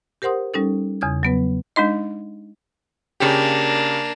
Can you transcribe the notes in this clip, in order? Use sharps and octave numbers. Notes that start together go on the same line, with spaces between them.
G4 A#4 C5 F#5 C6 D#6
G3 C#4 D#4 A4
E2 C#3 D#6 G#6
F#3 B3 B4
G#3 D4 D#4 D#5
C#3 A#3 D4 G4